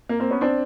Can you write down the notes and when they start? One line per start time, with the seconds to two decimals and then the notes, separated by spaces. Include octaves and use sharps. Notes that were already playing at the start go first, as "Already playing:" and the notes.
0.09 A#3
0.20 A#3 C4
0.31 B3 C#4
0.41 C4 D4